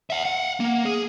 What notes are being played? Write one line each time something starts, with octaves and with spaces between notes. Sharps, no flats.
E5 F#5
F5 F#5
A#3
G#4